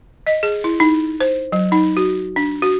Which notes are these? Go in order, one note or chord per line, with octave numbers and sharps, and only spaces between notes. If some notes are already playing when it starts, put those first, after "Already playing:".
D#5
G#4
E4
D#4
C5
F#3
D#4
F#4
D4
F#4